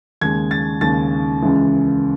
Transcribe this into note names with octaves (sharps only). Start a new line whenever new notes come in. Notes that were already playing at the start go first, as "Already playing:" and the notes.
D#2 C#3 G#3 G#6
A6
D#2 C#3 G#3 A6
C#2 C#3 E3 G#3